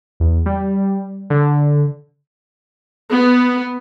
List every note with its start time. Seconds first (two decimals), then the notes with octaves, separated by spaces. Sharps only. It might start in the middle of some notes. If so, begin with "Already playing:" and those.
0.20 E2
0.46 G3
1.30 D3
3.11 B3